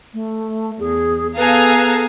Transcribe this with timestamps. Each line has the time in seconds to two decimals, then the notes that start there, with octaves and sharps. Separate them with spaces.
0.14 A3
0.79 E2 G#4
1.37 B3 G#4 A4 B4 F5 G#5 A#5